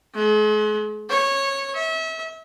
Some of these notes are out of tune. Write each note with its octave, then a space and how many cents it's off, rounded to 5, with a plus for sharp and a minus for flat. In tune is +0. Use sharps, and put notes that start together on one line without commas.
G#3 +40
C#5 -15
E5 -30